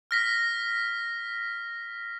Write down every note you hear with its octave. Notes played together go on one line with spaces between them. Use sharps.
F6 A#6 B6